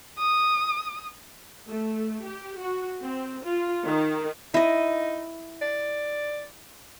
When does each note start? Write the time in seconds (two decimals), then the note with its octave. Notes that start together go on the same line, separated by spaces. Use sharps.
0.19 D#6
1.66 A3
2.25 G4
2.58 F#4
3.02 C4
3.46 F4
3.85 D#3
4.54 D#4 E4 D#5
5.62 D5